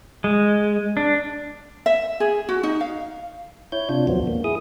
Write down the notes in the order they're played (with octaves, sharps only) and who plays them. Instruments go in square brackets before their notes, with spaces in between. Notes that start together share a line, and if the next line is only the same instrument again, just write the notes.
[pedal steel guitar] G#3
D4
[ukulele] E5
G#4
F#4
D#4
F5
[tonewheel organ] E4 C#5 G6
C3 D4 F4
D#2 A2 F3 F#3 B3
A#3
E4 G#4 D#6